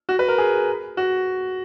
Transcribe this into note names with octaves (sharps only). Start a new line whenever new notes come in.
F#4
B4
A#4
G#4
F#4